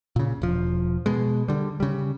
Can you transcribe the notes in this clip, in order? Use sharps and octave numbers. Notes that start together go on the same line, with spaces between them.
A#2 C#3
E1 F3
B2 G#3
D3 G3
C#3 G3